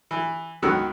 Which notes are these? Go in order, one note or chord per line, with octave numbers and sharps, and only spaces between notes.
E3
C#2 D#3 F#3 B3 E6 F#6